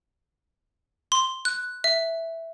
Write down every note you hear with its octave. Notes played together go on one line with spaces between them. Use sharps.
C6
F#6
E5